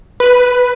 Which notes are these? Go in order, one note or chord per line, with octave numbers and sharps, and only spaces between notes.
B4